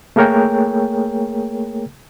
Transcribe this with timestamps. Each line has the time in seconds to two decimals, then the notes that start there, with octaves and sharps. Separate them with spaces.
0.16 A3 A#3 G#4 A#4 C#5 G5